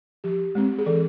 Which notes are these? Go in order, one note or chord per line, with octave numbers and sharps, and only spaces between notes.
F3 G4
G#3 C4
G#4
E3 A4